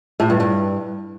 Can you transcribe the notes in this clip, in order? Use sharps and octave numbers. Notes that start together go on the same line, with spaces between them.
A2
G2
G2